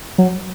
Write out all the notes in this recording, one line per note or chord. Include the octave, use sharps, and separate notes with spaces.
F#3